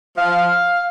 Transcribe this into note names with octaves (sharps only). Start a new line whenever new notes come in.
F3 F5